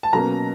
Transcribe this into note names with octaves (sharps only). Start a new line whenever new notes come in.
A5
B2 F#3 A#3 C#4 A#5